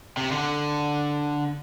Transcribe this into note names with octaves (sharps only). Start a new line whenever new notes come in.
C3
D3